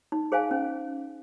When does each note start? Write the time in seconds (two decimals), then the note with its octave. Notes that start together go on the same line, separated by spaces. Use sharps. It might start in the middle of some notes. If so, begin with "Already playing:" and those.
0.12 D#4
0.32 G#4 C5 F5 G#5
0.51 C#4